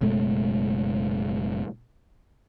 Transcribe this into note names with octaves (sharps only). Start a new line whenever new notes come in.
F#1 B2 G#3 A3